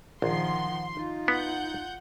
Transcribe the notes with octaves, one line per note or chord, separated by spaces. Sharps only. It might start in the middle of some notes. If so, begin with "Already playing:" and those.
A#1 D#3 F3 F#5 C6
D#4 F4
B3 F#5 G6